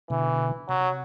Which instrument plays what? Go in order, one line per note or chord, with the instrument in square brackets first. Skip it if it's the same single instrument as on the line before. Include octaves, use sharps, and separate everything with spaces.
[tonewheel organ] B2 D3 [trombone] E3
[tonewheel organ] C3 [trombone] F#3